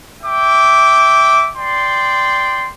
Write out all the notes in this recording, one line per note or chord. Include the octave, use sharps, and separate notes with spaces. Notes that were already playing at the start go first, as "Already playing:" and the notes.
E5 G5 D6
D5 G5 C6